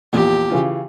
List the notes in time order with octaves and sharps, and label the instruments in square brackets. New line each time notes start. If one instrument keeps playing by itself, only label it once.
[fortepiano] A#1 E2 [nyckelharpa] G4
[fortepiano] C#3 E3 F4